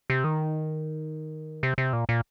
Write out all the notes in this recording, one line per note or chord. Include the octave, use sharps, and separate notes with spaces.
C3
D#3
C3
C3
A#2
A#2